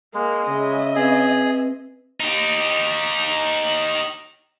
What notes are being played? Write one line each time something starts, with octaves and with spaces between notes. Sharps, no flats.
G#3 A#3
C#3 D#5 E5
C4 G#4 B4
D#4 G4